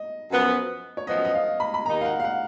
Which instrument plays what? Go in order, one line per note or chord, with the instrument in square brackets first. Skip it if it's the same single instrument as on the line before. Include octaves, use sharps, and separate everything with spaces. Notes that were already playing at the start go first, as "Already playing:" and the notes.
Already playing: [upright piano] D#5
[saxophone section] F#2 F3 B3
[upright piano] C#5
[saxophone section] F#2 F3 B3 [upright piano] D#5
[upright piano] D#5
F5
B5
B5
[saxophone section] D#2 D#3 A#3 D#4 [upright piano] A#5
[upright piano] F5
F#5
F5
F#5